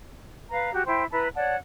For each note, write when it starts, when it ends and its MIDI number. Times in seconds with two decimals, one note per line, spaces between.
0.50 0.72 71
0.50 0.72 77
0.50 0.72 82
0.72 0.82 66
0.72 0.82 67
0.85 1.03 64
0.85 1.03 72
0.85 1.03 79
1.11 1.28 64
1.11 1.28 71
1.11 1.28 81
1.11 1.28 82
1.35 1.55 73
1.35 1.55 74
1.35 1.55 78
1.35 1.55 81